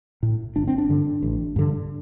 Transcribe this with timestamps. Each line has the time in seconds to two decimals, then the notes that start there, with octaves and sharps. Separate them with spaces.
0.23 A2
0.56 G1 D4
0.68 C4
0.78 D4
0.89 G2 D3
1.23 A1
1.56 G2 D3